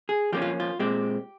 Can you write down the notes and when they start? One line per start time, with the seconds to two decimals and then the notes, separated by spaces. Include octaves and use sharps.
0.09 G#4
0.33 F3 A#3 C#4 G4
0.42 F4
0.60 F4
0.79 A#2 G#3 C4 G4